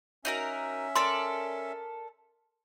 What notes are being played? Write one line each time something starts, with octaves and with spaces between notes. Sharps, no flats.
C#4 D#4 F#4 A#4 E5
A4 A#4 D5 C6